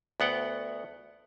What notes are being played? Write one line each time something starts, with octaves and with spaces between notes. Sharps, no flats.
D2 B3 F#5 G5